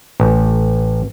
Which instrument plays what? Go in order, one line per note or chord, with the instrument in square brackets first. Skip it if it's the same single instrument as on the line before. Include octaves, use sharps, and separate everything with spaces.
[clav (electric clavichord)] A1